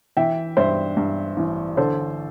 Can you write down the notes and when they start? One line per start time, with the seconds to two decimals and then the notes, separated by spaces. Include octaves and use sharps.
0.17 E3 E5 G5
0.57 G2 C5 E5
0.97 G2
1.37 A1
1.77 D3 A4 C5